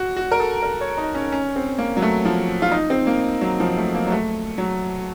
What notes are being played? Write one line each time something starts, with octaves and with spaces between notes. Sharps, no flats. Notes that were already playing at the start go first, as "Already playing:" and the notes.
Already playing: F#4
F#4
A#4
A4
A#4
C#5
D#4
C#4
C#4
C4
A#3
F#3
A3
F3
F4
D#4
C4
A#3
F#3
F3
A3
A#3
F#3
A3
F#3